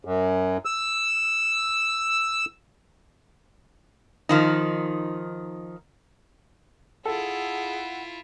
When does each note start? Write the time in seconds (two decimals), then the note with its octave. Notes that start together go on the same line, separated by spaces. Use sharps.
0.05 F#2
0.65 E6
4.29 D#3 F3 D#4
7.05 E4 F4 G#4 A4 F#5